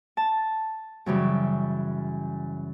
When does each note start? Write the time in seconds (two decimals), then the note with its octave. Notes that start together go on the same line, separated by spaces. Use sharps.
0.17 A5
1.06 F#2 C#3 E3 G3